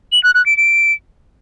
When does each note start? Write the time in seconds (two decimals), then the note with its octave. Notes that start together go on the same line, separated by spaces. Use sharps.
0.12 F#7
0.23 F#6
0.35 F#6
0.46 D7
0.57 D7